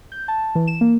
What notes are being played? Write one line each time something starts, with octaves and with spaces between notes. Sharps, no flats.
G6
A5
E3
E7
A#3